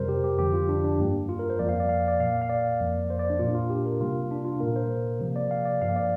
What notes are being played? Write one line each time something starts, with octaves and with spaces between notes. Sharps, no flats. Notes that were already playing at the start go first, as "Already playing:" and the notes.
Already playing: F2 C3 G3 A#4 C5
G4
G4
F2 D3 F3 G4
F4
D4
D4
G2 G3 A#3
F4
A#4
C5
F2 F3 A#3 D5
F5
D5
F5
D5
A#2 A#3 F5
F5
D5
F2 F3 A#3
C5
D5
D4
A#2 A#3 F4
D4
F4
G4
A#4
C3 G3 A#3 F4
D4
F4
A#2 A#3 A#4
C5
C3 F3 A#3
D5
F5
D5
G2 F3 A#3 F5
D5